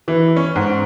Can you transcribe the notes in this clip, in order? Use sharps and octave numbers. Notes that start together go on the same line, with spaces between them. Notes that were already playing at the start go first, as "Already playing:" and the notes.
E3
C#4
G#2